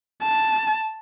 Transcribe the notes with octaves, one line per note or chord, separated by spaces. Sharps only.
A5